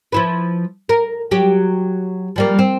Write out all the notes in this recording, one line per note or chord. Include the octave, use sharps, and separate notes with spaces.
F3 E4 B4
A#4
F#3 G4
F3 G3 A#3
C4